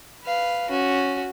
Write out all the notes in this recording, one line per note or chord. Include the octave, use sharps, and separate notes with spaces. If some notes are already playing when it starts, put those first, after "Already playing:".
B4 F5
C#4 F#4